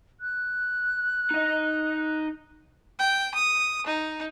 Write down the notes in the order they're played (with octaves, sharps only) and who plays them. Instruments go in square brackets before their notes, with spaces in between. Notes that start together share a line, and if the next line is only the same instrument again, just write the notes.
[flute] F#6
[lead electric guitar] D#4 D#5
[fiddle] G5
D#6
D#4